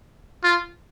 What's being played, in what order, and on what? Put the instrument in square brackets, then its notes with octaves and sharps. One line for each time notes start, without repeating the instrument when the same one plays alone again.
[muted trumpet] F4